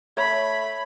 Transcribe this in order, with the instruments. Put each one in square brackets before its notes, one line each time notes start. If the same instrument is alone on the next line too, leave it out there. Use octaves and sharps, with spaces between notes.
[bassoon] A3 [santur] C#5 [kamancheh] B5